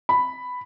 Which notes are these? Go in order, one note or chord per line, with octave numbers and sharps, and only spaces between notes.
B5